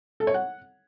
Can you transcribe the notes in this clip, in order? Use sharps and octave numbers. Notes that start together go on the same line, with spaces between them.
A4
C#5
F#5